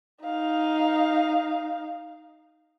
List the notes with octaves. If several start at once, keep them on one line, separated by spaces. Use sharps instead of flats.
D#4 F5